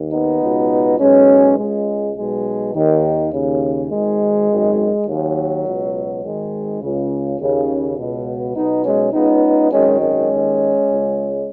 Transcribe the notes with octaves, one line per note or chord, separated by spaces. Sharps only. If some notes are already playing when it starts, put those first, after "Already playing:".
Already playing: D#2 D#3
B3 D#4
C#2 B2
B1 B2 G#3 C#4
C#2 C#3 G#3
B1 B2 G#3
D#2 D#3
D#2 C#3
G#1 G#2 D#3 G#3
G#1 F#2 D#3
D#2 D#3 F#3
C#2 B2
G#1 G#2 D#3 G#3
C#2 C#3
D#2 C#3
C#2 B2
B1 B2 B3 D#4
G#3 C#4
C#2 C#3 B3 D#4
G#1 F#2 D#3 G#3 C#4
G#3 C#4
D#2 D#3
C#2 C#3